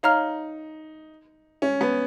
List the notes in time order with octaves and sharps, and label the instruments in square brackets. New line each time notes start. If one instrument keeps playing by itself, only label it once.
[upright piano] D#4 [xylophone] C#5 F5 A#5 F6
[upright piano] C#4
B3